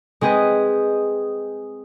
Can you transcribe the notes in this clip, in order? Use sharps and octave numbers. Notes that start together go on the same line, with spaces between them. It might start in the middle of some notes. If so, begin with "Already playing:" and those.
G#3 C4 G#4 B4 D#5